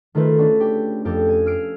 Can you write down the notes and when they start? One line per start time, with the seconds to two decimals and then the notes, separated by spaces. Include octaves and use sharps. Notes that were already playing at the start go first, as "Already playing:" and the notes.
0.15 D#3 A3 F4 A4 B4 C5
0.38 C#4 D4 F#4
0.60 G4
1.05 F2 G4 A4
1.29 G#5
1.46 E6 F6 C7 D7